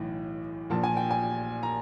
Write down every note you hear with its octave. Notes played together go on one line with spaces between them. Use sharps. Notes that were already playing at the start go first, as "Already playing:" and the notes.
Already playing: B1 A2 E3
A#1 A#2 A5
G#5
G5
G#5
A#5